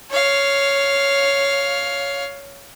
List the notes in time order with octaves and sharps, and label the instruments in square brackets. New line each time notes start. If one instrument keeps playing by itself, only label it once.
[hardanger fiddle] C#5 F5